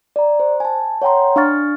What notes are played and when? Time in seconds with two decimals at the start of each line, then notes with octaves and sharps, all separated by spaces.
0.16 D5 A#5
0.40 C5
0.60 G#5 A5
1.02 C#5 F#5 G5 A#5 C6
1.36 D4 F5 C#6 F6 A6